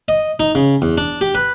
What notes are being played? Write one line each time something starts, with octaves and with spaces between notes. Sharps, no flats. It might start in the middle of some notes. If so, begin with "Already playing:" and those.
D#5
D#4
C#3
E2
D4
G4
B4